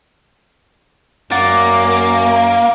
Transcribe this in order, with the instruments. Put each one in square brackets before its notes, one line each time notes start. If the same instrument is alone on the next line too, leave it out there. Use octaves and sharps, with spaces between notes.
[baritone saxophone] F#2 [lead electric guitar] A#3 [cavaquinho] D5 F#5
[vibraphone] F5